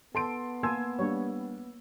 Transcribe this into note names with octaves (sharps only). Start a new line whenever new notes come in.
B3 A4 A5 C6 D7
A#3 G#5 A5 C6 E6 G#6
G3 A#3 D4 C#5